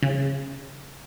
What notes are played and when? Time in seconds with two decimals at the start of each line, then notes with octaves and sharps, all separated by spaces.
0.03 C#3